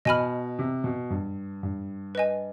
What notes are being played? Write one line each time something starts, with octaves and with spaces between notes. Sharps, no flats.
B2 D#5 G#5 B5 F6
C3
B2
G2
G2
B4 D#5 G#5